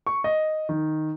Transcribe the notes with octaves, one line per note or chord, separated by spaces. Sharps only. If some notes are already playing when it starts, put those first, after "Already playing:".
C#6
D#5
D#3